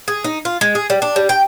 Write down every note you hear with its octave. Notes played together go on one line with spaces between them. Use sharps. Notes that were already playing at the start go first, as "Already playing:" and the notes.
G#4
D#4
F4
G#3
G#4
G3
D4
G3
G5